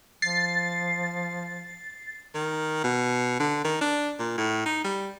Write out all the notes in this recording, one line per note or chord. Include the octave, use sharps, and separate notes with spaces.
F3 A6 C7
D#3
B2
D3
D#3
D4
A#2
A2
D#4
G3